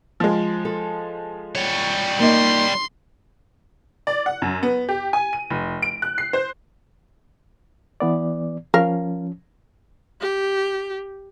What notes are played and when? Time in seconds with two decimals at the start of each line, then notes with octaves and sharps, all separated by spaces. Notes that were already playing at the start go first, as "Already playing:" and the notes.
0.20 F3 G#3
0.65 A4
1.55 G3 C#5
2.20 A#3 D#4 D#5 C6
4.07 D5
4.26 F#5
4.42 F#2
4.63 B3
4.89 G4
5.13 G#5
5.33 D#7
5.50 F1
5.82 D7
6.02 F#6
6.18 C7
6.33 C5
8.00 E3 B3 D5
8.74 F3 C#4 A#4 F5
10.21 G4